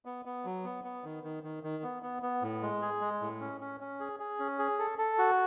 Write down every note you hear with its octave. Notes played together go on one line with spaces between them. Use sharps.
B3
B3
F#3
B3
B3
D#3
D#3
D#3
D#3
B3
B3
B3
A2
G#3
G#4
G#3
A2
C#4
C#4
C#4
G#4
G#4
C#4
G#4
A4
A4
F#4